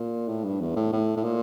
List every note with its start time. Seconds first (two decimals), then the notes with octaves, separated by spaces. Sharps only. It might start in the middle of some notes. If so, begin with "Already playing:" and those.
Already playing: A#2
0.28 A2
0.44 G2
0.60 E2
0.76 A2
0.92 A2
1.17 A2
1.24 A#2